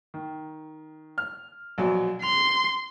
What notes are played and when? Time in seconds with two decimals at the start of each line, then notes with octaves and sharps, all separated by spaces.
0.14 D#3
1.18 F6
1.78 A#1 B2 F#3
2.22 C6 F7